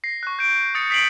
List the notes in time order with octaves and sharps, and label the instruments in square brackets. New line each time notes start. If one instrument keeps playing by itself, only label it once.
[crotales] A#6 C7
C#6 F#6
G6 D7
D#6 A6 C#7
D#6 B6 C7 D7 F#7